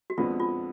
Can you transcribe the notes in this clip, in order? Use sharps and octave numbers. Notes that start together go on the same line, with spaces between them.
F#4
F2 F3 G#3 B3 D4 F4
F4